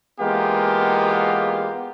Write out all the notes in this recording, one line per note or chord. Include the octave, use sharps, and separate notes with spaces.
E3 G#3 A#3 B3 F4 G4